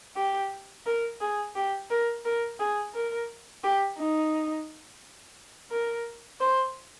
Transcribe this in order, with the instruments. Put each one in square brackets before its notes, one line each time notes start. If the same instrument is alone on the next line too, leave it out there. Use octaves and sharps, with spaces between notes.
[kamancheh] G4
A#4
G#4
G4
A#4
A#4
G#4
A#4
G4
D#4
A#4
C5